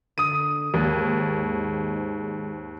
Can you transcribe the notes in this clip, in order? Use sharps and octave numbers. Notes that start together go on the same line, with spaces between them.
D3 D#6 D#7
D#2 G#2